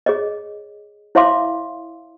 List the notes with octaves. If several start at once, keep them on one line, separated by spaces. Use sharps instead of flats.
G#4 C#5 D#5
E4 C#5 E5 F5 C6 D6